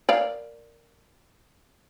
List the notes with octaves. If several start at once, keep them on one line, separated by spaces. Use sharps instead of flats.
A#4 D5 F5